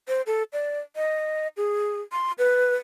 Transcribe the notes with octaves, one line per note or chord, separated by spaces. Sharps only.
C5
A4
D5
D#5
G#4
C6
B4